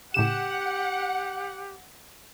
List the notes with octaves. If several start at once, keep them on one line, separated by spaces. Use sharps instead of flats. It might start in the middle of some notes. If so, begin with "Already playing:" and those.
A2 C#3 G4 F#5 E7